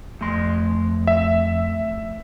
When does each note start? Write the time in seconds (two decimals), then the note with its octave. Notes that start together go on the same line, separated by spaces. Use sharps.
0.21 F2 A3 C6
1.07 E5